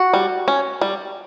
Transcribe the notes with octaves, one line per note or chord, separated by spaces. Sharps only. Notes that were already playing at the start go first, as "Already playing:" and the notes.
Already playing: F#4
G3
C#4
G3